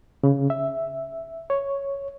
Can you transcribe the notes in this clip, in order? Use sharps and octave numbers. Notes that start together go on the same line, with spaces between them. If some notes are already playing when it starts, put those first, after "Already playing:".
C#3
E5
C#5